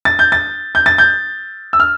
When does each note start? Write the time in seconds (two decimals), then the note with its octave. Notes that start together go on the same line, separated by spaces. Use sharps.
0.05 A6
0.19 G6
0.32 A6
0.75 G6
0.86 A6
0.98 G6
1.73 E6
1.80 F6